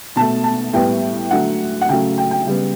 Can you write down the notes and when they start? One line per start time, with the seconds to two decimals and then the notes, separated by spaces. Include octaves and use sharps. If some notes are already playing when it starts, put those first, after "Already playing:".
0.16 B2 A3 A5
0.44 A5
0.73 A2 G3 B3 G5
1.31 D3 F#3 A3 F#5
1.81 F#5
1.88 C#3 F#3 A3 G5
2.18 G5
2.31 G5
2.46 C#3 G3 B3